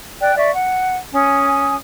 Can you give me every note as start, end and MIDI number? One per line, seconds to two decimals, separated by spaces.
0.21 0.33 74
0.21 0.33 79
0.21 0.33 90
0.36 0.51 74
0.36 0.51 76
0.36 0.51 85
0.54 0.96 78
1.13 1.75 61
1.13 1.75 80
1.13 1.75 87